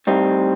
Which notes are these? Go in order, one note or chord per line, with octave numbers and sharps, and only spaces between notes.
A2 G3 C4 D#4